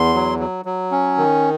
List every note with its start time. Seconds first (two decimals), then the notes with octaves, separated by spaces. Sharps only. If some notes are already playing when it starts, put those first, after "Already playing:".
Already playing: E2 C6
0.14 F#3
0.39 F#3
0.65 F#3
0.91 C#4
1.18 D#3